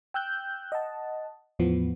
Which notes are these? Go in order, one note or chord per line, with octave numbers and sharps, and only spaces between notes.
G5 E6 F#6 G6
D#5 F#5 A5
E2 A2 E3 F3 B3